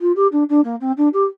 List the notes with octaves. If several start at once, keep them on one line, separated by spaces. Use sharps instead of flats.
F4
G4
D4
D4
A#3
C4
D4
G4